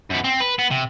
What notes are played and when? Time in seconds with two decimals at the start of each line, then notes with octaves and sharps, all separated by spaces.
0.10 F#2 B3
0.24 C4
0.40 B4
0.59 B3
0.71 C3